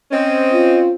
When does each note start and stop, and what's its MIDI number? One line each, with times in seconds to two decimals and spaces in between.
0.11 0.95 60
0.11 0.95 61
0.11 0.80 75
0.53 0.94 65